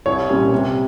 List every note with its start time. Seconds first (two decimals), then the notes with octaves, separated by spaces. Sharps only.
0.06 C2 C#5
0.29 A#2 G3 C#4
0.52 C3